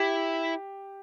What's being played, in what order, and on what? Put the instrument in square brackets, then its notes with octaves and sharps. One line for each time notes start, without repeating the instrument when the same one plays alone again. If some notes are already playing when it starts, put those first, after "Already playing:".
Already playing: [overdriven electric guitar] E4 [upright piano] G4